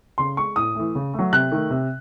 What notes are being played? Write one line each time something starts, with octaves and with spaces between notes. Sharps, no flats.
C#3 C6
G#3 C#6
A2 D#6
E3 A3
C#3
A3
F#3
C3 F#6
D#3 A3
C3